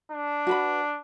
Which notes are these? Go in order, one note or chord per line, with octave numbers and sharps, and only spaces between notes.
D4
F#4 B4 B5